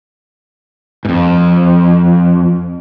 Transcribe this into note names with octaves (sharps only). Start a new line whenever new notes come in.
F2 G#2